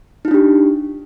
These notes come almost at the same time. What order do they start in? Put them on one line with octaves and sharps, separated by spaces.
D#4 F4 D4 G4